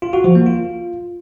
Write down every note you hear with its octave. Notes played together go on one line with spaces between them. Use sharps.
F4
F#4
F3
A#3
F4